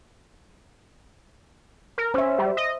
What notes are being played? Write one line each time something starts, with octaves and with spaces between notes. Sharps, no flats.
A#4
C#4 C5 E5
G3
D#5